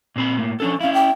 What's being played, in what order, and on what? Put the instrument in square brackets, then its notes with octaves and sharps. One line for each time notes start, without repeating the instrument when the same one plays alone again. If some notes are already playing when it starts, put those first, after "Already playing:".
[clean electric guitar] A#2 C4 B5
A2 A#3
[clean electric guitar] F3 D4 A4 [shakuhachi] C#4
[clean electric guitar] C#4 E4 [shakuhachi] F5
[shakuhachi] G5